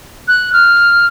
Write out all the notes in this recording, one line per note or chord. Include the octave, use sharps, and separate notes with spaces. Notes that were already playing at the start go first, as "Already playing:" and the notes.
F#6
F6